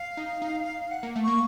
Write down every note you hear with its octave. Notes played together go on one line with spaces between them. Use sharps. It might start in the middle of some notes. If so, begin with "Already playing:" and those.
Already playing: F5
D#4
D#4
F#5
A#3
A3
A#3 C#6